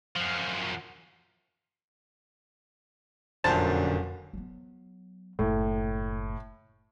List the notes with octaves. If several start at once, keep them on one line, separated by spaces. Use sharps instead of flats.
F#2 F3
F1 F#2 A#2 D3 C5 A5
F#3 B3
F#1 A2